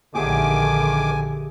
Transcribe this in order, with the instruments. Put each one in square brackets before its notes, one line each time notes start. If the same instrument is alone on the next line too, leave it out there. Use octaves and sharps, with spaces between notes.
[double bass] A#1 D3 [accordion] D#3 D6 [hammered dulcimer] G4 G#4 E5 [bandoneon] G#5